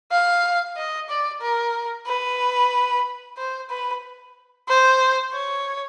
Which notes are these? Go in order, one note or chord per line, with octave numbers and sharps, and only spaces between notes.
F5
D#5
D5
A#4
B4
C5
B4
C5
C#5